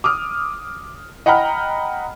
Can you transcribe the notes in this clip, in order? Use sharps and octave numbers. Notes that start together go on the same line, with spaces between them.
D6 D#6 F6
D#5 F#5 G5 A#5 B5 F6